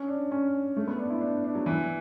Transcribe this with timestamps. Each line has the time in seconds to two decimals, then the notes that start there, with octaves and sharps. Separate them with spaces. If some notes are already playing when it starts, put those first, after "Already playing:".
Already playing: C#4
0.08 D4
0.32 C#4
0.77 A3
0.88 B3
0.99 D4
1.10 E4
1.21 D4
1.44 D4
1.55 F#3
1.66 E3